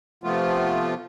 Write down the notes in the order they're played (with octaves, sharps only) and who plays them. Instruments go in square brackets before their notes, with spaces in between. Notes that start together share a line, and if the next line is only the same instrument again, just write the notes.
[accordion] C3 F3 A3 B3 F4